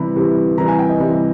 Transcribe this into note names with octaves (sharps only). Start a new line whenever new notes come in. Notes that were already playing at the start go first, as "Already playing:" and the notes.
Already playing: C3 E3 G3 B5
C3 E3 G3
C3 E3 G3 A#5
G#5
G5
D#5
C3 E3 G3